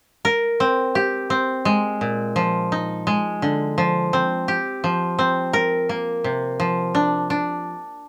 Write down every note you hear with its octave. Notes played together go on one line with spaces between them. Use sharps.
A#4
C4
G4
C4
G#3
A#2
F3
D#4
G#3
D3
F3
C4
G4
F3
C4
A#4
A#3
C3
F3
D4
D4